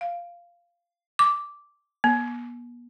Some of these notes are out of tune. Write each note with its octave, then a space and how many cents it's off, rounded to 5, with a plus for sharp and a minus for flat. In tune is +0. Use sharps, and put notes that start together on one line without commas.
F5 -10
D6 -5
B3 -40